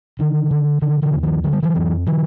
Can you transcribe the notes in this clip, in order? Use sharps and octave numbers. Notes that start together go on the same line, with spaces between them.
D3 D#3
D3
D3 D#3
D3 E3
D#2
D#3 F3
D3 F#3
G3
E3 F#3
F2
D#3 F3